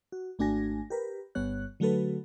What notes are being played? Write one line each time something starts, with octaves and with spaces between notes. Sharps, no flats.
F#4
G#1 A3 D4 F#4 G#5 A#6
G4 A#4 B4
G1 G2 B3 C#5 F#6
D3 F#3 A3 F#4 A4 B4